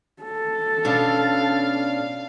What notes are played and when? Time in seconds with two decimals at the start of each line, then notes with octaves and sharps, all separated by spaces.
0.23 A4
0.85 B2 C#4 D4 F5